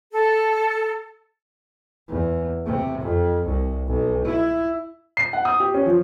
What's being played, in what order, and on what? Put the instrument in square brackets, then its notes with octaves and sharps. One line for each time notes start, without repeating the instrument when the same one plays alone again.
[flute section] A4
[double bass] E2
C3
F2
C2
B1
E4
[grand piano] C7
F#5
D#6
G4
C#4
F3